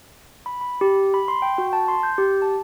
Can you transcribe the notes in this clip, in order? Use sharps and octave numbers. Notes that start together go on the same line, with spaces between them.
B5
B5
G4
B5
C6
G5
F#4
A5
C6
G6
G4
A5